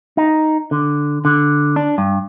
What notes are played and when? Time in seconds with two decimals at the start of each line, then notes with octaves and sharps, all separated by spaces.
0.17 D#4
0.71 D3
1.25 D3
1.76 D4
1.98 G2